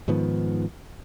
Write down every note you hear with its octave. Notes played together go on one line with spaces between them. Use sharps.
G#2 D#3 F3 B3